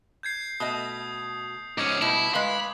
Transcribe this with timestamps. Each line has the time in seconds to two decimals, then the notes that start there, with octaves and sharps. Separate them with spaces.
0.23 G6 G#6 C7
0.60 B2 A3 D#5 D#6
1.78 G#2 C#4 D6 G#6
2.02 B2 G3 E4
2.34 G#3 B4 F5 B5